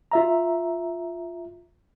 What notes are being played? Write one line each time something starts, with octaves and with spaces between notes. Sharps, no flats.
F4 E5 A#5